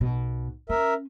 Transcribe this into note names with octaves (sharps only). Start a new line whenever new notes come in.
B1 B2
C#4 A#4 E5